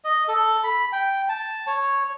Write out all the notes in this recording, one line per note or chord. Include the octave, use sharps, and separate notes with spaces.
D#5
A4
B5
G5
A5
C#5